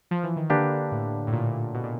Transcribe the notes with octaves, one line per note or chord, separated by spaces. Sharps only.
F3
E3
D#3
D3 A#3 D4 G4 B4
A2
A2
A#2
B2
A#2